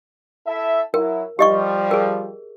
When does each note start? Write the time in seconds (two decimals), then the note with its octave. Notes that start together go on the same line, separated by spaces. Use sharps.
0.46 E4 A4 E5
0.94 F#3 E4 A#4
1.39 F3 G3 G4 D#5 C#6
1.91 G#4 A#4